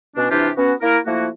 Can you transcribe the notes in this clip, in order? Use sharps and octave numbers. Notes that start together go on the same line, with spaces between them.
B2 C#4 D4
C3 E3 D4 E4 F4 G4
B3 C#4 F#4
A#3 E4 A#4
F3 A3 A#3 E4 F#4